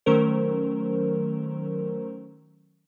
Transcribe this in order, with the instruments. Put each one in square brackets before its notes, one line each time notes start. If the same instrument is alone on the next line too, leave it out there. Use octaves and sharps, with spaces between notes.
[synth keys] D#3 F#3 A3 C#4 A#4 C5